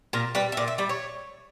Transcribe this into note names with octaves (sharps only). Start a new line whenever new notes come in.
A#2 A#4
G3 B4
E5
A#2 D5
E5
G3 D5
C#5